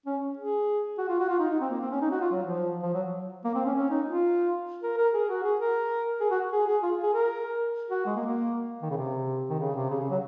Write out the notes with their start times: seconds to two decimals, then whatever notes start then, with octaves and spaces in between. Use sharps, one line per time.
0.06 C#4
0.37 G#4
0.98 F#4
1.09 F4
1.19 F#4
1.29 F4
1.39 D#4
1.50 D#4
1.60 C4
1.70 A#3
1.81 C4
1.91 C#4
2.01 D#4
2.11 F#4
2.21 F4
2.31 F#3
2.42 F3
2.82 F3
2.94 F#3
3.44 A#3
3.55 C4
3.65 C#4
3.76 C#4
3.90 D#4
4.06 F4
4.83 A#4
4.97 A#4
5.14 G#4
5.29 F#4
5.43 G#4
5.60 A#4
6.20 G#4
6.31 F#4
6.52 G#4
6.67 G#4
6.83 F4
7.03 G#4
7.13 A#4
7.90 F#4
8.06 G#3
8.16 A#3
8.26 A#3
8.82 D#3
8.90 C#3
8.97 C3
9.50 D#3
9.60 C#3
9.75 C3
9.90 C#3
10.00 C#3
10.10 F#3